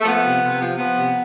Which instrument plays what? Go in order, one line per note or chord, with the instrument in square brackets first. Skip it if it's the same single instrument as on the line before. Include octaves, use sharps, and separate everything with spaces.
[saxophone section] A3
F3 B3
C3
C3
F3
F3 B3
C3